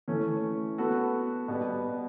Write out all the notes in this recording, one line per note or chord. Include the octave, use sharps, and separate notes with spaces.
E3 A3 C#4
B3 F#4 A4
B2 G3 B3